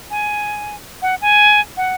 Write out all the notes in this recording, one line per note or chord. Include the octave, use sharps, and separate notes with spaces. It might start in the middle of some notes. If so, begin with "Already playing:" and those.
G#5
F#5
G#5
F#5